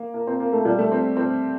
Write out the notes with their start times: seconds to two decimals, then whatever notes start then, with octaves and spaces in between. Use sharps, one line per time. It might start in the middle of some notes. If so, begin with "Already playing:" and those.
Already playing: A#3
0.14 A#3
0.27 C4
0.40 A#3
0.53 A3
0.65 G3
0.78 A3
0.92 C4
1.17 C4